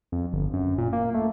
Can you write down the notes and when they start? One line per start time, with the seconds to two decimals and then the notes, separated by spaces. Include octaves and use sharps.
0.12 F2
0.33 G1
0.54 F#2
0.78 A#2
0.93 A#3
1.14 A3